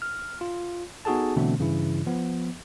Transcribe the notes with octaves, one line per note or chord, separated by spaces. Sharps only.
F6
F4
B3 D#4 F#4 G#4 A4 A5
B2 D3 E3 A3 C4 D4
G2 C#3 E3 E4
F3 B3